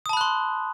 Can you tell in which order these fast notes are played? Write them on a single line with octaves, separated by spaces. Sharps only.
D#6 A5 B5 F#6 C6